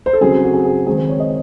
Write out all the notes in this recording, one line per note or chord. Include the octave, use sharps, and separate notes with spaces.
C5
A4
C#3 F#3 C4 G#4
F#4
G#4
G#4
D#3 G#3 C4 G#4
C5
C#5
D#5